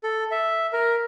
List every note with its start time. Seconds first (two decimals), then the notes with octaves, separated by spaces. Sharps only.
0.03 A4
0.31 E5
0.73 A#4